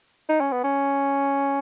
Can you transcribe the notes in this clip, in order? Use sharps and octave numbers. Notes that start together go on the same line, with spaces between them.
D#4
C#4
B3
C#4